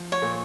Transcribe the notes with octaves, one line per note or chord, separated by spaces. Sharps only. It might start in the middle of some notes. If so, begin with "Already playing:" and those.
Already playing: F3
C#5
A#2